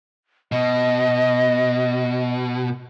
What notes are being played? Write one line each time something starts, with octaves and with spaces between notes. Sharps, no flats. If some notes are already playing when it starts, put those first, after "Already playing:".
B2 D#5